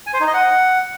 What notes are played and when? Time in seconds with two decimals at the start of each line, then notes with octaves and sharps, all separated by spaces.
0.07 G#5
0.14 C5
0.20 D#4
0.27 D#5
0.34 F#5